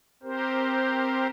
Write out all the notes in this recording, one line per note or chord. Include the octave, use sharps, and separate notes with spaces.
C4 G4 A#4 C5